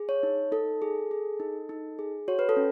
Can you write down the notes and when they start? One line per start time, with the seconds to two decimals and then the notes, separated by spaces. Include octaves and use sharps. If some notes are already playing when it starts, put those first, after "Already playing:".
Already playing: G#4
0.09 C#5
0.23 D#4
0.52 D#4 A4
0.82 G#4
1.11 G#4
1.40 D#4
1.69 D#4
1.99 G#4
2.28 F#4 C#5
2.39 B4
2.49 A4
2.57 C#4